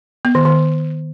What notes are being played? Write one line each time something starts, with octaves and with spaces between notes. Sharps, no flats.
B3
D#3
D#3